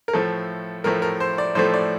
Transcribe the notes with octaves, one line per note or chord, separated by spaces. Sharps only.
A#4
A2 F3 A3 A4
A2 F3 A3 A#4
A#4
C5
D5
A2 F3 A3 C5
D5